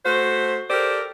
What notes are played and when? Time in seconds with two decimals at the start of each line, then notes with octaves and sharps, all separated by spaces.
0.05 A3 F#4 C5
0.70 G4 A4 A#4 C5 D5